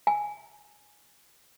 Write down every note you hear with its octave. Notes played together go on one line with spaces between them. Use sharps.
G#5